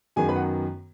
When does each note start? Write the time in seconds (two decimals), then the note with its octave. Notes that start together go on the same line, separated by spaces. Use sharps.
0.16 F#2 D#3 B3 G#4 G#5
0.29 B4 B5
0.36 F#5